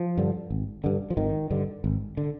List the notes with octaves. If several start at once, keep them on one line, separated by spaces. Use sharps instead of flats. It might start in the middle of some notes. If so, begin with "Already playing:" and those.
Already playing: F3
G2 D3
G#1
G2 D3
F3
G#1 D#3
G2 D3
G#1
D3